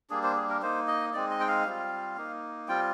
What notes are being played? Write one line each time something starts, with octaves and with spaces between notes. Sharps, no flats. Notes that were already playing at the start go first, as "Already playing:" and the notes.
G3 A#3 D4 G#4
C5
G#4
A#4
A#3 D#4 C5
D#5
G#3 C4 D#4 D5
D#5
G5
F5
G3 C4 F4
A#3 D#4
G3 C4 F4 G5